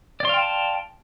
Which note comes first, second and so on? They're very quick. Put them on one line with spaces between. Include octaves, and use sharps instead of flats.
D5 C6 F5 G5 A5